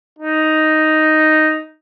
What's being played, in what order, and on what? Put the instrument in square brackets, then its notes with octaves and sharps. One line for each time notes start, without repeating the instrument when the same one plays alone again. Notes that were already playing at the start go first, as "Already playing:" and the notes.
[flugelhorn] D#4